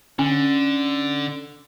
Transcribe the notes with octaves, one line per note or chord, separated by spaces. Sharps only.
D3 C#4